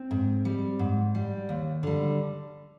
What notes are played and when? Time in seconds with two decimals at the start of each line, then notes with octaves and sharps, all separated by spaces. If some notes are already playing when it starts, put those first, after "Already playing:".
Already playing: C4
0.11 G#2
0.45 G3
0.79 G#2
1.15 G3
1.49 D#2
1.83 D3 G3